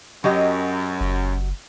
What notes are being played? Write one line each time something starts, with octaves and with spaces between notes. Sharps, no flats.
F#2 F#3 G4 D#5
F#1